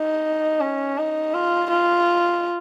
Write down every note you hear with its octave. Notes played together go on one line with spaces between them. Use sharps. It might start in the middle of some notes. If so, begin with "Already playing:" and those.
Already playing: D#4
C#4
D#4
F4
F4